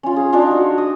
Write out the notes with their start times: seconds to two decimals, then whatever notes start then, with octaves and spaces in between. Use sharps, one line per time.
0.03 C#4 F4
0.16 G#4
0.33 D4 D#4 F4
0.51 F#4
0.78 D#6